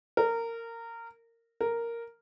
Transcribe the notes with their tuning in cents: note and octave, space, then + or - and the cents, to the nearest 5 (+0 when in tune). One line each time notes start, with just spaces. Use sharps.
A#4 -20
A#4 -5